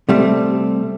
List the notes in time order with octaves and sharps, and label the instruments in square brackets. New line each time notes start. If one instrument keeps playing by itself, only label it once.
[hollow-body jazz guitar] C3 G3 A3